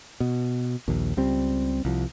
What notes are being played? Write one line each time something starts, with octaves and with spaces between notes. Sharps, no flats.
B2
A#1 D#2
C#2 G3 C4
C2 F3